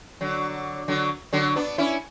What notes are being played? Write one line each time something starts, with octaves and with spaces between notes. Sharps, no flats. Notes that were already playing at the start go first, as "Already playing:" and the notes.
D3 F#3
D3 F#3
D3 F#3
B3 D4
C#4 E4